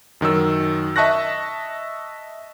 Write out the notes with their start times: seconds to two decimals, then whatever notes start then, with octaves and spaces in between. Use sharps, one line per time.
0.21 F#2 D#3 F#3 E6
0.96 D#5 E5 A5 C#6 F#6 A#6